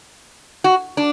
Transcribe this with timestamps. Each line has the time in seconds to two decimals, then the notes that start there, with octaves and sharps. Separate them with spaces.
0.64 F#4
0.97 D4